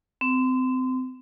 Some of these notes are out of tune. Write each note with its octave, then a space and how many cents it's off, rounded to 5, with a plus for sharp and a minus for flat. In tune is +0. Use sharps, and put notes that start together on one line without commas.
C4 -30